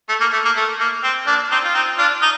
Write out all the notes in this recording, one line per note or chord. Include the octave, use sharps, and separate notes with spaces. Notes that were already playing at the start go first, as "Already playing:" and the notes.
A3
A#3
A3
A#3
A3
A#3
C4
A#3 D4
C4 D#4
F4
C4 D#4
D4 F4
D#4